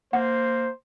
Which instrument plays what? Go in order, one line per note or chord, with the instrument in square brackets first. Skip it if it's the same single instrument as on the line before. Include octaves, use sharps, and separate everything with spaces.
[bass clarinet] A#3 [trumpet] C5 [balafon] F#5